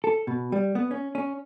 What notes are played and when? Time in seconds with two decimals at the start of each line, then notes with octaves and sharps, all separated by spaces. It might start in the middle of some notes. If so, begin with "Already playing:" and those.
0.04 A4
0.27 B2
0.52 G3
0.75 B3
0.91 C#4
1.15 C#4